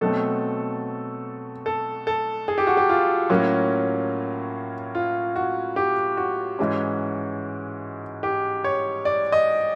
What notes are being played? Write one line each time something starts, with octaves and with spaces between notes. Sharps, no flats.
B2 F#3 A3 C4 A4
A4
A4
G#4
G4
F#4
G4
F4
A2 F#3 A#3 C#4
F4
F#4
G4
F#4
G#2 E3 G#3 C#4
G4
C#5
D5
D#5